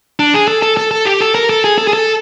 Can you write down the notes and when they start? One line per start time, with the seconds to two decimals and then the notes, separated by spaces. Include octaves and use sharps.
0.19 D4
0.34 G#4
0.48 A4
0.62 A4
0.77 A4
0.91 A4
1.05 G4
1.21 A4
1.35 A#4
1.50 A4
1.64 G#4
1.78 A4
1.87 G#4
1.93 A4